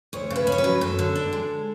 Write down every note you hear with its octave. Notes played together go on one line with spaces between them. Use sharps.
D2 C#5
C#3
B4
C#4
C#5
B4
F#3
F#2 A4
D3
D4
G#3